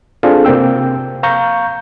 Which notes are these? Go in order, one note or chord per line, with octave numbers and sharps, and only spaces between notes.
C4 D4 F4 G#4 A4
C3 A#3 C4 G5 E6
F5 A#5 C#6 G6